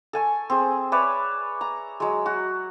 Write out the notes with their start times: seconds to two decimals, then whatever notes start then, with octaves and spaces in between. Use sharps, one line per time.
0.13 A4 G#5 C#6
0.50 C4 G#4
0.92 B4 C#5 D5 E5
1.61 A#5
2.00 F#3 G#3
2.26 F#4